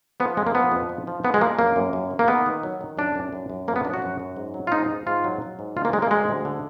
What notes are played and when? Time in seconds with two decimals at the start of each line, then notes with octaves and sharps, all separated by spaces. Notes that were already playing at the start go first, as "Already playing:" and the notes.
0.20 F3 B3
0.37 F2 G#3
0.47 A#3
0.55 F3 B3
0.72 F2
0.89 F3
1.07 F3
1.24 F3 B3
1.34 G#3
1.41 F3 A#3
1.59 F#2 A#3
1.76 F#2
1.93 F#2
2.11 D#3
2.19 A#3
2.28 D#3 B3
2.46 D#3
2.63 F#3
2.81 D#3
2.97 F#2 D4
3.15 F#2
3.33 F#2
3.50 F#2
3.68 F3 A#3
3.76 B3
3.85 F#2 D4
3.94 F#4
4.02 F#2
4.20 F#2
4.36 G#2
4.54 F#3
4.67 F4
4.72 G#2 D#4
4.90 G#2
5.06 G#2 F4
5.24 F#3
5.42 F#3
5.59 G#2
5.77 D2 F4
5.85 A#3
5.93 D3 G#3
6.02 A#3
6.11 D2 G#3
6.29 D2
6.45 D3